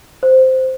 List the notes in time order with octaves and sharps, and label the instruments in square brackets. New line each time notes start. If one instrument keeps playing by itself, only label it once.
[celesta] C5